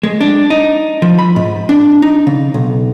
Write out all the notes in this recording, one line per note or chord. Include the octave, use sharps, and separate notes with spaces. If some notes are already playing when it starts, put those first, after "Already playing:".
G#3
D4
D#4
F3
B5
G#2
D4
D#4
C#3
B1